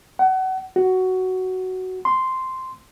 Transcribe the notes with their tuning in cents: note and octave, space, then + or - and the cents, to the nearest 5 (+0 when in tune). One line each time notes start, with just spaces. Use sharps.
F#5 +30
F#4 +10
C6 -5